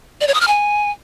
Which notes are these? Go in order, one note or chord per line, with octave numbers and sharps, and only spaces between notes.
D5
C#5
D#6
F6
G#5